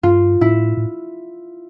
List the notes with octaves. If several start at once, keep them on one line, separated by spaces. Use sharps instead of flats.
G2 F4
A2 E4
A2